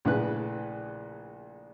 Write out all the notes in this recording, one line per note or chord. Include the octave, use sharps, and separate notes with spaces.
A#1 A2 C#3 B4 F#6